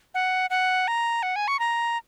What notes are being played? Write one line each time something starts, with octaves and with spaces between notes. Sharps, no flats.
F#5
F#5
A#5
F#5
G#5
C#6
A#5